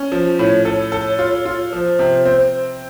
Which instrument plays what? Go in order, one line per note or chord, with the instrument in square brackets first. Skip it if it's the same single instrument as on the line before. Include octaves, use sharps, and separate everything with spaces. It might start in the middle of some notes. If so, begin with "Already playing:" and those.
Already playing: [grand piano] C#4
[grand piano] F3 [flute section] C5
[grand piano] A2 [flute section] C#5
[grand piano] A4 [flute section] C#5
[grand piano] A4
F4
F4
[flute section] C#5
[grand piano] F3 [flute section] C5
[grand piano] C3
C4